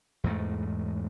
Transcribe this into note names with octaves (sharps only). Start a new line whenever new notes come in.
E2 G#2 A3